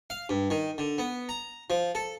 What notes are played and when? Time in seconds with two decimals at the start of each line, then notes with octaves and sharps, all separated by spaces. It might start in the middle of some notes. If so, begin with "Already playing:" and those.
0.10 F5
0.29 G2
0.50 D#3
0.78 D3
0.98 B3
1.29 A#5
1.70 F3
1.95 A4